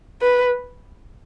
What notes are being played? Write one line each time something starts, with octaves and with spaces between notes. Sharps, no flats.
B4